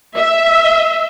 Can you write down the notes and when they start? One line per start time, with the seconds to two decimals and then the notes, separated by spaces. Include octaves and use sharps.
0.18 E5